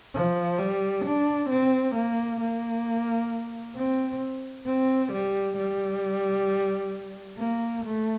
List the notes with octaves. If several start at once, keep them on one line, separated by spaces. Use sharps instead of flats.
F3
G3
D4
C4
A#3
A#3
C4
C4
G3
G3
A#3
A3